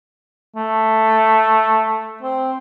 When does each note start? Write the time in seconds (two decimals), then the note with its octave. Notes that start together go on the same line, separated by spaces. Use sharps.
0.56 A3
2.23 C4